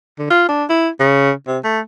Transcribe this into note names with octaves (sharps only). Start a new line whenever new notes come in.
D3
F4
D4
E4
C#3
C3
A3